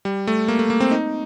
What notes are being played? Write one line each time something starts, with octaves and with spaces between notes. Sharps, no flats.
G3
A3
A#3
A3
A#3
C4
D#4